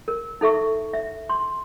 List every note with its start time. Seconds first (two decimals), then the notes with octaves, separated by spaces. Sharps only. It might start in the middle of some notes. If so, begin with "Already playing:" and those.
0.08 A#4
0.41 D#4 A4 E5 C#6
0.93 E5
1.30 C6